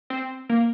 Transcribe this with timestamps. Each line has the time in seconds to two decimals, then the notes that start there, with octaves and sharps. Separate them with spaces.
0.10 C4
0.49 A#3